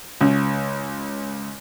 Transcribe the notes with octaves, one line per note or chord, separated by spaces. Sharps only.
C#2 C#3